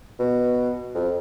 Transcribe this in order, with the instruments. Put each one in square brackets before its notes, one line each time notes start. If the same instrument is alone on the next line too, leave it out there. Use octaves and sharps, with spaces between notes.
[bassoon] B2
F2